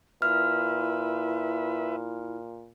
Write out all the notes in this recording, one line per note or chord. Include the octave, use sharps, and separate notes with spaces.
A#2 E4 B4 E5 F6